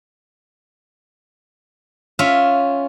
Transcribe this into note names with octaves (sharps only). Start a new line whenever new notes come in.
C#4 F4 E5